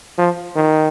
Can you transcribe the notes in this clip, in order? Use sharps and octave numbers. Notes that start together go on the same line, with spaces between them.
F3
D#3